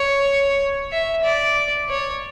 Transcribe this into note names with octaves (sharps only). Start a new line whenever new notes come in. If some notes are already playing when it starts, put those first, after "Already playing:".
Already playing: C#5
E5
D5
C#5